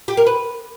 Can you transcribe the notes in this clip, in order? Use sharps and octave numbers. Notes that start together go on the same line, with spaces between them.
G4
A#4
B4